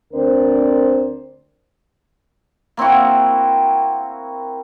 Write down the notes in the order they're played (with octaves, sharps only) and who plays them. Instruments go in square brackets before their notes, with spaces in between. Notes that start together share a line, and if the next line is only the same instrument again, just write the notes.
[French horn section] D2 C4 D4 A#4 C5 D5
[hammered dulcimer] A#3 C4 E4 F#4